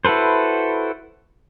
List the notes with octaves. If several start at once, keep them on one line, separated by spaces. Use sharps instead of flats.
E4 F#4 A4 B4 C5